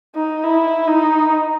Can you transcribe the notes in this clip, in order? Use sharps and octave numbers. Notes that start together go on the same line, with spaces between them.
D#4
E4
D#4